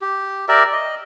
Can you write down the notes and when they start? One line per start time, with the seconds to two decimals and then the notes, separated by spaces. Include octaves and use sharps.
0.01 G4
0.48 G4 A#4 D5 E5
0.73 D#5